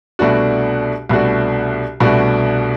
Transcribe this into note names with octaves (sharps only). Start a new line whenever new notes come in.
C2 B2 A3 D4 F#4
C2 B2 A3 D4 F#4
C2 B2 A3 D4 F#4